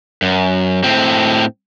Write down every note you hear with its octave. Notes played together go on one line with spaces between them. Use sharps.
F#2
A2 C4